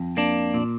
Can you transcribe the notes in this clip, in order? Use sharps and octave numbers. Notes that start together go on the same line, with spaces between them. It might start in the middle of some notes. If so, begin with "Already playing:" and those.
Already playing: F2
A#3 D4
A#2